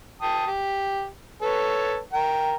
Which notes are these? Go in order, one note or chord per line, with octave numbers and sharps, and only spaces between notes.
G5 A5 D#6
G4
A4 B4 C#5
A#4 G5